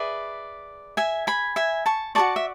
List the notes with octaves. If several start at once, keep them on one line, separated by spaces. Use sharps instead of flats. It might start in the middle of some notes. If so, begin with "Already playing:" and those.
Already playing: G#4 B4 D5 E5
E5 G#5
G#5 B5
E5 G#5
A5 C#6
F#4 A4 D5 A5 C#6
E5